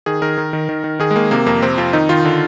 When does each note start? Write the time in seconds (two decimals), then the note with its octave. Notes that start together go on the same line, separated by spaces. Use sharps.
0.06 D#3 G#4
0.22 D#3 A#4
0.38 D#3
0.53 D#3
0.69 D#3
0.84 D#3
0.99 D#3 G#4
1.11 G#3
1.15 D#3 A#3
1.31 C3 A#3
1.46 F2 A#3
1.62 C3 C4
1.78 F2 F4
1.93 D#3 D#4
2.09 D#3 F4
2.25 D3